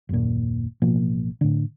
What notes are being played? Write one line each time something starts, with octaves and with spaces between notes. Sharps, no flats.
F#1 D#2 A#2
A1 B2 F3 A#3
A2 D3